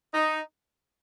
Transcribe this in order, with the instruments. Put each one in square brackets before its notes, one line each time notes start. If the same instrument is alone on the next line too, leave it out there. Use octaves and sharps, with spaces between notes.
[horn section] D#4